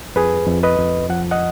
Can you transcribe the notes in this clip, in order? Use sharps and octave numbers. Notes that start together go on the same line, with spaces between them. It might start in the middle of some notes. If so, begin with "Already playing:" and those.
F2 G#4 B4
F2
B4 D#5
F2
F3 F#5
D#5 F#5